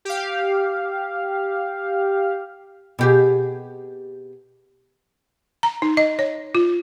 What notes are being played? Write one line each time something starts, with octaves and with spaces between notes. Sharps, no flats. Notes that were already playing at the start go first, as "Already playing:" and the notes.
G4 F5
B2 G4 G#4
A#5
D#4
D#5
C#5
F4